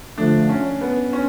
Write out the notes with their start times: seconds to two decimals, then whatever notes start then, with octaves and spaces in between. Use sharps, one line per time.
0.18 D3 F3 A3 D4
0.49 C#4
0.81 B3
1.13 C#4